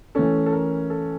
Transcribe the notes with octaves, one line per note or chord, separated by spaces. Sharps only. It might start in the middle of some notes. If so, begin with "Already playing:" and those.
E3 A3 C#4 A4
A4
A#4
A4